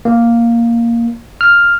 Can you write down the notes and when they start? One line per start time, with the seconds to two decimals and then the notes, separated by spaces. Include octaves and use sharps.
0.05 A#3
1.41 F6